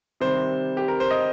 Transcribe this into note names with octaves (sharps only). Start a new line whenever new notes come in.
C3 D#3 G3 C5
G4
A#4
C5
D#5